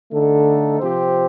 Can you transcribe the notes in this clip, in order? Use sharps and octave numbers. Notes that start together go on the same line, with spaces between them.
D3 A3 D#4 A4
C3 F3 C4 G4 C5